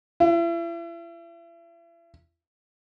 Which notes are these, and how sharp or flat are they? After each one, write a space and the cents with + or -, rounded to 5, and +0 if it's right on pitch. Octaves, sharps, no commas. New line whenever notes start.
E4 +40